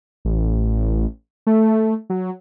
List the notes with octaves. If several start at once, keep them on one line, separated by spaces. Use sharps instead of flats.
A1
A3
F#3